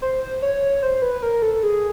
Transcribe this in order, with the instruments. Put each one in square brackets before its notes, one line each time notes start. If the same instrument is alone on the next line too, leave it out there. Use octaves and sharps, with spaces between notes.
[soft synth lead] C5
C#5
C5
B4
A#4
A4
G#4